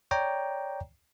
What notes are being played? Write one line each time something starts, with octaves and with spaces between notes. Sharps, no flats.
C#5 D5 G5 A#5